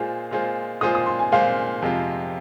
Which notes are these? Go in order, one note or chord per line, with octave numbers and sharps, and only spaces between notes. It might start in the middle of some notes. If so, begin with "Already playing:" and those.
Already playing: A#2 G#3 F4 G#4 C5
A#2 G#3 F4 G#4 C5
A#2 G#3 F4 G#4 C5 D#6
D#6
C6
G#5
A#2 G#3 F4 G#4 C5 F5
F2 C3 G#3 F4